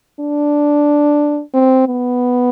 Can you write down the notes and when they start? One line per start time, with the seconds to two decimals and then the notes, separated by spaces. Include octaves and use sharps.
0.20 D4
1.54 C4
1.87 B3